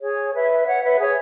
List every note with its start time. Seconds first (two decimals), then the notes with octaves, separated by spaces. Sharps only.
0.02 G#4 C#5
0.35 B4 E5
0.67 C#5 F#5
0.83 B4 E5
1.00 G#4 C#5